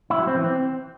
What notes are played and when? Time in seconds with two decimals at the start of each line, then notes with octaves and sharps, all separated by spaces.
0.10 E4
0.19 F#3
0.27 C4
0.36 E3
0.44 C4